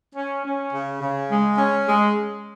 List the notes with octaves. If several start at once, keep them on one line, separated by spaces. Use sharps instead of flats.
C#4
C#4
C#3
C#3
G#3
C#4
G#3